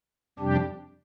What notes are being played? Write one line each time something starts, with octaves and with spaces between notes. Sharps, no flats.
F2 C3 G3 D4 G4